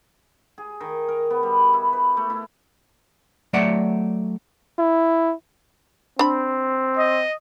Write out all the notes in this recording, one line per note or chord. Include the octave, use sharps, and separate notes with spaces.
G#4
D#3
A#4
B3
G3
E4
B4
A3
E4
F#3 A3 C#5 D5 E5 F#5
E4
C4 D4 B5
D#5